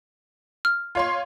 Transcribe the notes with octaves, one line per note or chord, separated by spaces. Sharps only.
F6
F4 C#5 C6